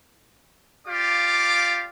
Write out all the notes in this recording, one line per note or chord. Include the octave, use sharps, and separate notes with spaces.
F4 G4 D5 F5 D6